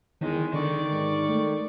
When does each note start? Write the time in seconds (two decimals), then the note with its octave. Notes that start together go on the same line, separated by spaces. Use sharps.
0.21 E2 D#3 G#3
0.54 D3 D#3 D5 C#6
0.92 G#2
1.28 A3